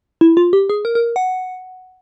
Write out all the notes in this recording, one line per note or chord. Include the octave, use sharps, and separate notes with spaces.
E4
F4
G4
G#4
A#4
A#4
F#5